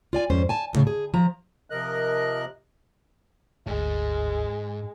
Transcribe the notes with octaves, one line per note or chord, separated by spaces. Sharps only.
F4 D5 G#5
F2 G#2 C#4 C5
G#5 A5
E2 A2 C#3
G#4
F3 A#5
C3 F3 A#4 D#5 F#6
G1 D2 G#2 G#3